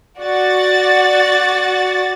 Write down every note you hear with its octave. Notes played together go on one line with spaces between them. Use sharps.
F#4 D5 F#5 A6